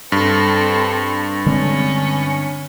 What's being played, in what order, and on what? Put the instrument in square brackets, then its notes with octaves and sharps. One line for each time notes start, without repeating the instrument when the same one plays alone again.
[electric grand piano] G2 [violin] C4 A4
[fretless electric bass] D3 G#3 C4 [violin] C#4